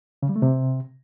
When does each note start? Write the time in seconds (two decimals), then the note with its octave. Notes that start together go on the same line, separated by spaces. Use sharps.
0.23 C#3
0.29 G3
0.36 A3
0.42 C3